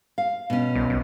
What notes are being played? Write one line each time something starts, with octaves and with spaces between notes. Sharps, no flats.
F5
B2 C#4
C2
B1